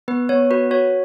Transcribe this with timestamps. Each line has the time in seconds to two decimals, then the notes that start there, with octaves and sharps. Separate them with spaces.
0.08 B3 B4
0.29 B3 C#5
0.51 F#4 B4
0.71 F#4 C#5